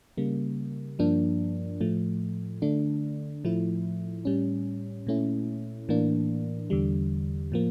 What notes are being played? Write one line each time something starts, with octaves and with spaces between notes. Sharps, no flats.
C#3 G3 A#3
G2 F3 A#3 D4
A2 F3 A3
D3 A3 D4
A2 F3 A3 E4
A2 G3 C#4
A#2 A3 C#4 E4
A2 E3 A#3 D4
E2 D3 G3
A2 F3 A#3